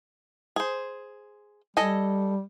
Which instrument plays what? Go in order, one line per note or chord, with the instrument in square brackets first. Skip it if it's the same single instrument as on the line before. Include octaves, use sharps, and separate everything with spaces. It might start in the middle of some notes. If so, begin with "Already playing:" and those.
[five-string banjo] G#4 C5
[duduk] G3 [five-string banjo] A4 D#5 G#5